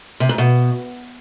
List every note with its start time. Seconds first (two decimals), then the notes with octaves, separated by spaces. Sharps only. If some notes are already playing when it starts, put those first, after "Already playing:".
0.20 C3
0.29 G#2
0.38 B2